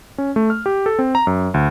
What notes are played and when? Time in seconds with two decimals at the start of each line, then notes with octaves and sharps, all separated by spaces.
0.18 C#4
0.36 A3
0.50 F6
0.66 G4
0.86 A4
0.99 C4
1.15 A#5
1.27 F#2
1.54 D2